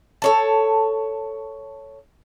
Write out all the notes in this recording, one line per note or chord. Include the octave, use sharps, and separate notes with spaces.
A4 C#5 A5